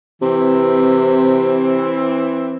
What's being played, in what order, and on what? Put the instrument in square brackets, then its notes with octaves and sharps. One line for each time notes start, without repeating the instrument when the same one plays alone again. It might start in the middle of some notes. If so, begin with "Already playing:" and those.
[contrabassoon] C3 [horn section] E3 C4